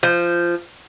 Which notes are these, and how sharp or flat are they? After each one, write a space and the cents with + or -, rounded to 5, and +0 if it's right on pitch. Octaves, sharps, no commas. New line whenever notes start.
F3 -15